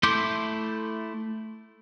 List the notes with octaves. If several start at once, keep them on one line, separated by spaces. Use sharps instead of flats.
A3 E4 C6 D6 G6